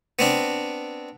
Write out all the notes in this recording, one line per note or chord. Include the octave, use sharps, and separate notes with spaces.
B3 C4 D4